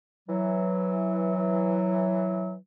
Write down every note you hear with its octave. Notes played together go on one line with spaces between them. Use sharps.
E3 F#3